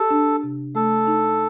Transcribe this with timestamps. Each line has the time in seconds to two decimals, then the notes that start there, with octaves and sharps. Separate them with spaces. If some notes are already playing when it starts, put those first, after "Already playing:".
Already playing: G4 A4
0.10 D4
0.43 C3
0.75 A3 A4
1.07 D#4